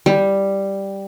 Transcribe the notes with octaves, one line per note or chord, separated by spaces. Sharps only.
G3